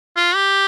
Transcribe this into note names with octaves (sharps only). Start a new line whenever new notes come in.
F4
G4